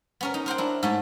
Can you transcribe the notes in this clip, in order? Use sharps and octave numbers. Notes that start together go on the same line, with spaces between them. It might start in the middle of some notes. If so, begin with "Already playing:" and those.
B3 C#4 A#4
D#4
A#4 C5 F#5 G5
D4 E4
G#2 A3 C#5